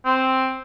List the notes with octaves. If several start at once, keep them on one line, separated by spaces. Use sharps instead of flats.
C4